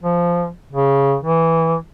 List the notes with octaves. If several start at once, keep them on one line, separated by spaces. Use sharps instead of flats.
F3
C#3
E3